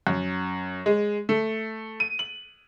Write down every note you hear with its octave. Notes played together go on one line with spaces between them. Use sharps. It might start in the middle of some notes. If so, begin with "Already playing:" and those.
F#2
G#3
A3
D#7
F#7